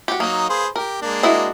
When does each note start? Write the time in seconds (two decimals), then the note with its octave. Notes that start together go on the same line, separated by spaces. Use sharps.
0.08 F#4 G4
0.20 F#3 A#3 D#4 D#6
0.49 G#4 B4 C5
0.76 G4 A#4
1.02 G#3 A#3 D4
1.23 E4 F#4 D#5